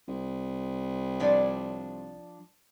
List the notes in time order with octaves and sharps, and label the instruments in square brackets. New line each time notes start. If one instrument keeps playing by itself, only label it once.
[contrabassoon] C2
[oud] F3 D4 C#5